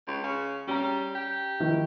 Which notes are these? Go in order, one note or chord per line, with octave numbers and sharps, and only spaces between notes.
C#2
C#3
G3 C#4 A#5
G4
D#3 F3 E4